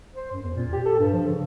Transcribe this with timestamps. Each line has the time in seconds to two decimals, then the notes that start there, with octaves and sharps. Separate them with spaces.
0.15 C5
0.31 F#2
0.43 E2
0.55 A#2
0.73 G4
0.85 A4
0.99 G2
1.13 F3
1.27 C#3